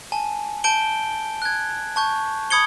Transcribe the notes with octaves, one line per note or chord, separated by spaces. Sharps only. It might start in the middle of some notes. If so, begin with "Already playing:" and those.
G#5 A5
A5 G6 D7 G7
F#6 G#6
A5 C#6 G6
B5 D#6 G#6 C#7 G7